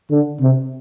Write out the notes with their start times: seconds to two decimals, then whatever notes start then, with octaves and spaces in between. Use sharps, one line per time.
0.10 D3
0.41 C3